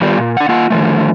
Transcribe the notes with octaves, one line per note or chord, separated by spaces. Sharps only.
D#3 G3 B3 F4 G4 D5
A#2
D4 F#5
A#3 F4 F#5
D3 D#3 F3 A3